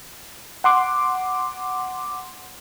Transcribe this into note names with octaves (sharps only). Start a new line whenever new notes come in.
F#5 C6 D6